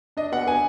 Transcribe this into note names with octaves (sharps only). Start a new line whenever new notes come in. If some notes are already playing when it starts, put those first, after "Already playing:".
D4 D#5
B3 F#5
B3 G#5